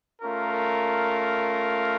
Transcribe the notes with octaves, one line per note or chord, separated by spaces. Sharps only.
A3 C#4 F4 A#4